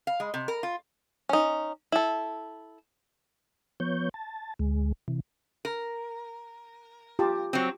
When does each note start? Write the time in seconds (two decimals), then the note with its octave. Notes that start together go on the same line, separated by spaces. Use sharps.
0.07 F5
0.20 G#3
0.34 C3
0.48 A#4
0.63 F4
1.29 C#4 D#4
1.92 E4 A4
3.80 F3 B3 C#5 G6
4.14 A5
4.59 D2 G#3
5.08 C3 E3
5.65 A#4
7.19 F4 G4 A5
7.53 F#3 C4